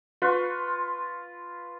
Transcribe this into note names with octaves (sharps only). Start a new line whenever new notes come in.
F4 B4 C6 C#6